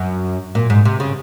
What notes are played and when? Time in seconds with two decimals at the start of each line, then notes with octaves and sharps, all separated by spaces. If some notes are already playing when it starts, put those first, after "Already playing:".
Already playing: F#2
0.55 A#2
0.70 G#2
0.85 C3
1.00 C#3